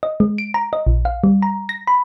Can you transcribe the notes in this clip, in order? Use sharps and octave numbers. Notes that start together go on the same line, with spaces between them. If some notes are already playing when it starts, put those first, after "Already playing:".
D#5
G#3
D7
A#5
D#5
A#1
F5
G3
A#5
A#6
B5